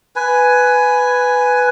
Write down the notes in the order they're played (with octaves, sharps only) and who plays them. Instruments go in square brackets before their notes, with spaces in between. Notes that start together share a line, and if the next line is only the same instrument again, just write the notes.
[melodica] B4 G#5